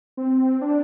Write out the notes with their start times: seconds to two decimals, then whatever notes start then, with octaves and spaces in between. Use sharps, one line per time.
0.17 C4
0.61 D4